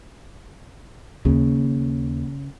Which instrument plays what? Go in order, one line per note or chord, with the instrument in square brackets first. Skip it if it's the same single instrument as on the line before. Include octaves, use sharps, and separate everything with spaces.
[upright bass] D#2 [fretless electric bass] C#3